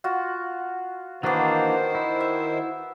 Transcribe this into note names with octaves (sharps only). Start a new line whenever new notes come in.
F4 F#4
D#3 E3 A#3 B3 D4 F#4 C5
E4
E5